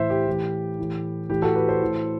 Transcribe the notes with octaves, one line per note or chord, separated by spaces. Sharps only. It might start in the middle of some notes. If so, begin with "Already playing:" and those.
Already playing: A2 E3 C5 E5
G4
A2 E3
A2 E3
A2 E3 G4
F#4 A4
G4 B4
A4 C5
A2 E3